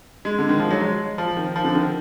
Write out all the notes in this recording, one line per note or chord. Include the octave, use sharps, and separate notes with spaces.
G#3
D3
D#3
F3
F#3
G#3
F3
D#3
F3
D3
D#3